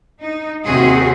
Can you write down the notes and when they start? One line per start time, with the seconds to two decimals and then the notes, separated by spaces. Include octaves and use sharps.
0.20 D#4
0.65 D#2 C3 C4 C#4 F#4 G#4